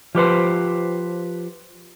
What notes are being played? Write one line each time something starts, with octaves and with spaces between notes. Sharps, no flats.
F3 G4 B4 C5